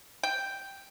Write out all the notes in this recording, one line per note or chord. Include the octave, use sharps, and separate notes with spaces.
G5